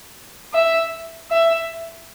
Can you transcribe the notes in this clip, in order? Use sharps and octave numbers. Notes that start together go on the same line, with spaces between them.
E5
E5